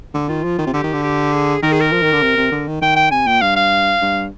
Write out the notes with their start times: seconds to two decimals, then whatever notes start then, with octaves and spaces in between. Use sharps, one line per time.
0.14 D3
0.28 D#3 F4
0.44 F3
0.58 D#3
0.66 C3
0.73 D3 G4
0.83 D#3
0.93 D3
1.03 G4
1.33 G#4
1.62 D#3 A#4
1.72 G#4
1.81 A#4
1.92 F3
2.02 D#3
2.13 D3
2.23 C3
2.37 C3
2.51 D3
2.67 D#3
2.81 D#3 G5
2.96 G5
3.11 C3 G#5
3.26 A#2 G5
3.41 G2 F5
3.56 F5
4.01 G2